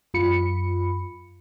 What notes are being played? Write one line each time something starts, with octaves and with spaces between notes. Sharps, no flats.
F#2 F4 B5 C#7